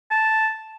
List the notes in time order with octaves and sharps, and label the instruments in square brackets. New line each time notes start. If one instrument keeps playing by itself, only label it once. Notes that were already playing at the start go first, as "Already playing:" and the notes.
[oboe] A5